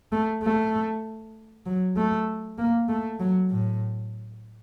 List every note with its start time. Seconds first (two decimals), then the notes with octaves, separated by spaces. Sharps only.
0.12 A3
0.43 A3
1.66 F#3
1.96 A3
2.58 A#3
2.89 A3
3.20 F#3
3.50 A2